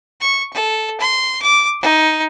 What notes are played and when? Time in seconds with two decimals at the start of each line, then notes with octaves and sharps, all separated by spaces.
0.21 C#6
0.53 A4
1.00 C6
1.42 D6
1.81 D#4